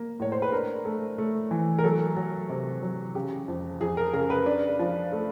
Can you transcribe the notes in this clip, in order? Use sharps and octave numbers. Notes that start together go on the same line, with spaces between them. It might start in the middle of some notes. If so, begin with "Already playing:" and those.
Already playing: A#3
A2 C#5
C5
B4
D4 A#4
A3
A3
E3
A#4
F#3 A4
F#3
C3
F#3
C#3 G4
F2
F2 G#4
A#4
C#3 A#4
B4
D4
F3
A3